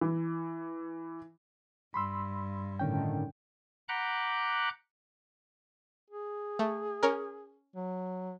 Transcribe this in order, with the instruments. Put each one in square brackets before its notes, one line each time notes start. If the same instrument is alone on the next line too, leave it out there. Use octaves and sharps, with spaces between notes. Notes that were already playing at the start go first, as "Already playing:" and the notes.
[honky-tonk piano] E3
[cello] G2 [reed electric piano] B5 C6 E6
[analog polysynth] A2 D3 D#3 [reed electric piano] C#4 G5
[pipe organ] F#5 A#5 B5 D6 F#6 G6
[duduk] G#4
[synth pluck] A3
C#4 A#4
[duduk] F#3